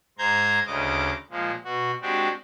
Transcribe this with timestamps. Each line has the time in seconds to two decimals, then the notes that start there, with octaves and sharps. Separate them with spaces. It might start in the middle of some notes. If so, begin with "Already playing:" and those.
0.18 G#2 C5 A#5 G6 G#6
0.66 D2 C#3 D#5 D6
1.30 A#2 F3 G#3
1.64 B2 F#4
2.02 G#3 C4 D4 F#4 G4